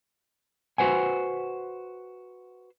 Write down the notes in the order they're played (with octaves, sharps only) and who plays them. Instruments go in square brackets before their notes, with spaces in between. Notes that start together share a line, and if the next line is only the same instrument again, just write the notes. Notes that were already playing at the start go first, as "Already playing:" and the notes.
[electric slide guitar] F#4 B4 C5 F#5 G#5